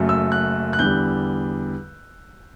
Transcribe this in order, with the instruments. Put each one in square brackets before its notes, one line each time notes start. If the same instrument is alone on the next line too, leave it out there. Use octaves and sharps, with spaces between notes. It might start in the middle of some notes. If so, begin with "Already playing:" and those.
Already playing: [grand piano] F#1 F#2 F#3 A3
E6
F#6
F#6
E2 D3 G3 G6